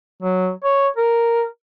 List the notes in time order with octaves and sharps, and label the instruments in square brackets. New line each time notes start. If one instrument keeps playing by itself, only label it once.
[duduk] F#3
C#5
A#4